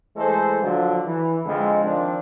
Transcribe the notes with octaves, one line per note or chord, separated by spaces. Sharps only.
E3 G#3 A3 A4 C5
D3 F3 F#3
E3
F2 D3 G#3
D#3 F3 C4 D4